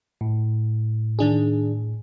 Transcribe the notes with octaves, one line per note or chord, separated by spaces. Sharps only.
A2
D#3 D4 G#4